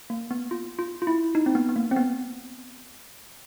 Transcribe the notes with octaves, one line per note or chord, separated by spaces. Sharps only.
A#3
B3
F4
F4
F4
E4
D#4
C4
B3
B3
A#3
C4
B3